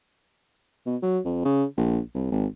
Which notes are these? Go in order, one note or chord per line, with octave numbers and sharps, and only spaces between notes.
B2
F#3
F2
C#3
A#1
C2
G#1